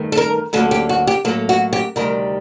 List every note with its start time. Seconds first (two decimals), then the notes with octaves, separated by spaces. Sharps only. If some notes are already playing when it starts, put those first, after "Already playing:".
Already playing: G2 D#3 A3
0.12 A4
0.17 A#4
0.53 D2 D3 F#3 A#3 A4
0.71 G4
0.89 F#4
1.07 G4
1.25 A2 F#3 A#3 A4
1.49 F#4
1.73 G4
1.96 D2 C3 D#3 G3 A#4